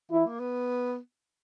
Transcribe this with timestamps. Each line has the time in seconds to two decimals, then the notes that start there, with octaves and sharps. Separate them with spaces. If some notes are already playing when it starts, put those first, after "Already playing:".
0.11 E3 E4
0.26 A#3
0.40 B3